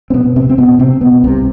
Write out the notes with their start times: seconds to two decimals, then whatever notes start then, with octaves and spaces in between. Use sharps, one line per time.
0.10 C4
0.14 B2 B3
0.36 C3 C4
0.49 C4
0.58 B2 B3
0.79 C3 C4
1.01 B2 B3
1.24 C2 C3